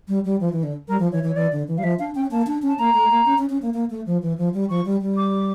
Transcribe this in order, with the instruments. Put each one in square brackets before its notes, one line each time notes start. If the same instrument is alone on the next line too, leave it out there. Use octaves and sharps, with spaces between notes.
[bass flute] G3
G3
F3
E3
D3
[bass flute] G3 [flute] A#4
[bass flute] F3
[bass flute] E3 [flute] C#5
[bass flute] E3
[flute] C#5
[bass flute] E3 [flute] D5
[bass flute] D3
E3
[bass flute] G3 [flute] F5
[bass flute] F3 [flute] E5
[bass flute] D4 [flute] F5
[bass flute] C#4 [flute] G5
[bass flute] A#3 [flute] A5
[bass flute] D4
[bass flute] C#4 [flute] A5
[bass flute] A#3 [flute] A#5
[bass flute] A3
A#3
C#4
C#4
C#4
A#3
A#3
A3
F3
E3
F3
G3
[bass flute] F3 [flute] C#6
[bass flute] G3
G3
[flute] D6